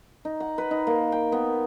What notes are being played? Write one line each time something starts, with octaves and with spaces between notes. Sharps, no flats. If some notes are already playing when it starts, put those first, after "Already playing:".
D#4
F#5
B4
D#4
A#3
G5
B3